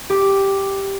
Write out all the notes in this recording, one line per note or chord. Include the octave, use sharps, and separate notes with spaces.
G4 D6